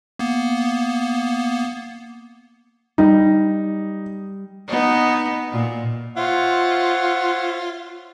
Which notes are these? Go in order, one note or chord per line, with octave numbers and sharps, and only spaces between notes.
A#3 B3
G3 D#4
B3 D#4
A#2
F4 C5 C#5 E5 F#5